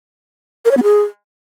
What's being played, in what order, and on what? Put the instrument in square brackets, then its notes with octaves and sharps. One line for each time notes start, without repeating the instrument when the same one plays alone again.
[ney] A#4
C#5
B3
G#4